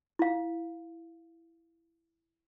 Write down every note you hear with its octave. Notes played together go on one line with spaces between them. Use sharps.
E4 F5